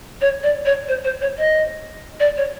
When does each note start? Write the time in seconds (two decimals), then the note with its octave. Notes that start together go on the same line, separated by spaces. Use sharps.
0.21 C#5
0.43 D5
0.65 C#5
0.88 C5
1.04 C5
1.21 C#5
1.38 D#5
2.20 D5
2.37 C#5